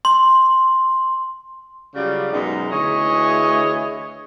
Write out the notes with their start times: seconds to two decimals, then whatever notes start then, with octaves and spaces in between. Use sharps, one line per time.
0.05 C6
1.95 C#3 F#3 G3 F4 D5
2.32 F#2 B2 G#3 D#4
2.70 D2 E3 G#4 C#5 D#5 E5